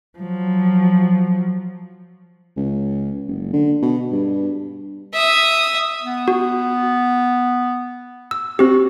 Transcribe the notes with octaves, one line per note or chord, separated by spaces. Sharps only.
F3 F#3
C#2
F#1
D3
B2
G2
E5 D#6
B3
F#4
E6
C4 F#4 G4